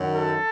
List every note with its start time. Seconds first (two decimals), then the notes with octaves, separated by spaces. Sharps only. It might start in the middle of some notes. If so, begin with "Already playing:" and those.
Already playing: F#2 D#3 F#3
0.15 A4